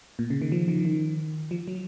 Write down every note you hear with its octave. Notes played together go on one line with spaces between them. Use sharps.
A#2
C#3
D#3
F3
D#3
D#3
F3
F#3